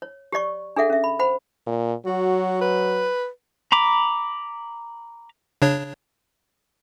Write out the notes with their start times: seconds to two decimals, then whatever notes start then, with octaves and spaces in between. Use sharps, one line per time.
0.02 C#5
0.32 G4 C#5 D5 C#6
0.76 D4 G#4 A4 E5 F#5
0.90 C#4 E5
1.04 B5
1.19 C5 F#5 B5
1.67 A#2
2.06 F#3 F#4
2.61 B4
3.72 A#5 B5 D6
5.62 C#3 D4 C#5